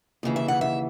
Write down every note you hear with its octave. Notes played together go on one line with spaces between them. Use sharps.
D#2 C#3 E3
E5
F#5
E5